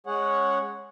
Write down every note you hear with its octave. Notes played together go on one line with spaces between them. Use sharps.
G#3 C#4 G#4 C#5 F#5